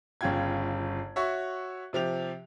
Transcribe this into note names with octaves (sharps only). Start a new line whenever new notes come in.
G1 C#3 F4 G5 G#6
F#4 C#5 E5
C3 F3 G4 F7